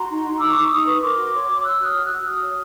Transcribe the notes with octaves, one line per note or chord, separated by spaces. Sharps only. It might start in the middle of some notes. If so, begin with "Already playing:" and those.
Already playing: F#4 A#5 C6
D#4
D#4
D#4 D6 E6
D#4 C#6
D6
D#4 C#6 D#6
B4
C#6
A#4 C6 D6
F#4
C#5
C#5
C#5 E6 F#6
F#4
D#6 F6
F#4
E6 F#6
F#4
F#4 D#6 F6
C#5